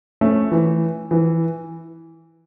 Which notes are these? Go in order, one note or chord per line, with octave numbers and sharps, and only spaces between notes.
A3 C#4
E3
E3